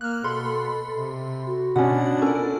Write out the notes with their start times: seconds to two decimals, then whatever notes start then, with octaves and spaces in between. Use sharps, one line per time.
0.01 A#3 F6 F#6
0.24 B2 A4 B5 C6
0.94 C3
1.46 F#4
1.76 B2 C#4 D4 F#5
2.22 C#4 F4 A4 A#4